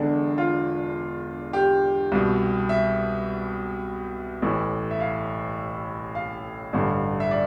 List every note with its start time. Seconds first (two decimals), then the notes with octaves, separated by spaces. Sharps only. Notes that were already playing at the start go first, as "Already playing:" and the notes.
Already playing: E1 E2 D3 D4
0.38 F4
1.53 G4
2.12 C2 B2
2.69 E5
4.42 A1 A2 E3
4.91 E5
5.00 F5
6.15 F5
6.73 A1 G2 D3
7.20 E5
7.31 D5